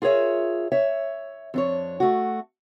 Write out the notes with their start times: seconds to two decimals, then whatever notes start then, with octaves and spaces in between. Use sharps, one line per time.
0.02 F4 G#4 A#4 C#5 E5
0.72 C#5 E5
1.54 F2 D4 C#5
2.00 A3 F#4